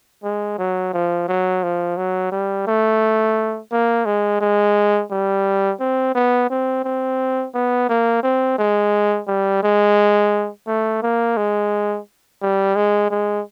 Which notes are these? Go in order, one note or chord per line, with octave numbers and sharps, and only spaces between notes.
G#3
F#3
F3
F#3
F3
F#3
G3
A3
A#3
G#3
G#3
G3
C4
B3
C4
C4
B3
A#3
C4
G#3
G3
G#3
A3
A#3
G#3
G3
G#3
G#3